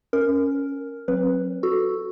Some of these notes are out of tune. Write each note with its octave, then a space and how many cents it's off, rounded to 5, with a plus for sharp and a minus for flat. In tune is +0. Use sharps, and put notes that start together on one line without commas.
C#4 +0 A#4 +0
F#3 -20 C4 +30 B4 +0
F#4 +0 A4 +0